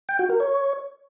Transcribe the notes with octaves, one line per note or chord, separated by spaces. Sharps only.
G5
F#4
A#4
C#5